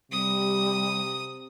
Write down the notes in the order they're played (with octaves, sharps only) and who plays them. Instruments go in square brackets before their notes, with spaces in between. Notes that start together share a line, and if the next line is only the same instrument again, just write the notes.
[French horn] C3 [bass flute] G3 [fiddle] D#6